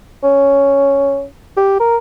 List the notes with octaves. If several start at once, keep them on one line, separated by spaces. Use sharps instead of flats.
C#4
G4
A#4